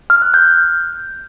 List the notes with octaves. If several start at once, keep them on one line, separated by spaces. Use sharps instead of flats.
F6
F#6
G6